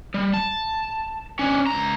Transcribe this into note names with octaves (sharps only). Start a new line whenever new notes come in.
G3
A5
C#4 D4
C#2 A#5